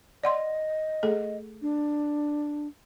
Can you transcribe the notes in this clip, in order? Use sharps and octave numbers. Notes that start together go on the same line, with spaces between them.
D5 D#5 F#5 C6
A3 G#4 A4
D4